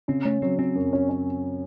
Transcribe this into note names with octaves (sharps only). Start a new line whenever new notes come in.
C#3 C4
A3 C#4
F#3 C4
C4 C#4
F#2
C#4
C#4